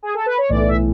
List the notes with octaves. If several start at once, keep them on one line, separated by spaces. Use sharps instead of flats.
G#4
A4
B4
C#5
B1 A2 E3 D5
E5